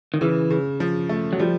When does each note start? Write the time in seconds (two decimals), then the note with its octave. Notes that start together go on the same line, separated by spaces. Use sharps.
0.14 D#3
0.21 C#3 E3
0.50 C#3
0.80 F3
1.09 A3
1.33 F#3
1.39 F3 G3